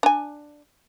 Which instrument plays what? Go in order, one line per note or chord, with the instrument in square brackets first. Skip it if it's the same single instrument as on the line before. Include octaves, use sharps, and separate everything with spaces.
[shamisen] D4 G#5